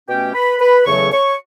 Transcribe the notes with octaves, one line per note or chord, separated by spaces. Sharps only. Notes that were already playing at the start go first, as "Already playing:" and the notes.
B2 A3 C#4 G4 G5
B4 B5
B4 B5
E2 C#3 F#3 A3 C#4 C#5 C#6
C#5 C#6